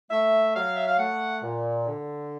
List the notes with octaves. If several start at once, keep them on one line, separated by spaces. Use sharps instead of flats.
A3 E5
F#3 F5
E5
F5
A3 F#5
A#2
D3